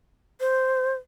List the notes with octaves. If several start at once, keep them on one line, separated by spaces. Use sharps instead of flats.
C5